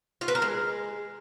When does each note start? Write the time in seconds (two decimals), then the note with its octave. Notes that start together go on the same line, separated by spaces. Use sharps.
0.21 F4
0.28 B4
0.35 A#4
0.42 G#3